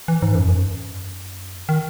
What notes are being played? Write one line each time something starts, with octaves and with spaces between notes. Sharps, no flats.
E3
G#2
F#2
F#2
D#3